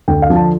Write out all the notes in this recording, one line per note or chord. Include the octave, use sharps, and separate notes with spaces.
D2 G5
F5
D3 F3
A5